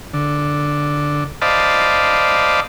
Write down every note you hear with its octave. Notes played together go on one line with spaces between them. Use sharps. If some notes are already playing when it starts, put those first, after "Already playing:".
D3
C5 D5 D#5 F5 A5 B5